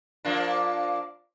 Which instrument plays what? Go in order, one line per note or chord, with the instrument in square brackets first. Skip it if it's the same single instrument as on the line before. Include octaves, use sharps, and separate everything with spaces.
[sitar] F3 A#3 D4